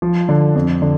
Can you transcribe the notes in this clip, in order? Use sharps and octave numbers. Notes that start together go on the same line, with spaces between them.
F3
D3
F2
D3